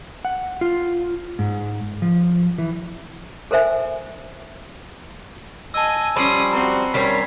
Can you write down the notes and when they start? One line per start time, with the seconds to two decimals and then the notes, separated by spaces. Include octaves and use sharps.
0.25 F#5
0.61 F4
1.39 G#2
2.02 F3
2.58 E3
3.51 A4 A#4 C5 E5 G#5
5.74 D#5 G#5 A5 E6
6.16 F3 G3 C#4 B5 C6 D#6 C7
6.52 C4 F#4 A#5
6.94 D#3 G3 C#4 B6 C7